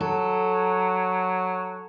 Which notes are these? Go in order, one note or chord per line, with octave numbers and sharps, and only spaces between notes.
F#3 A4